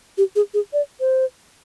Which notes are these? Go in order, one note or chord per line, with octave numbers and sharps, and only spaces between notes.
G4
G#4
G#4
D5
C5